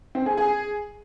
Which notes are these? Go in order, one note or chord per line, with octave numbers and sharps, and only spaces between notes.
C4
G#4
G#4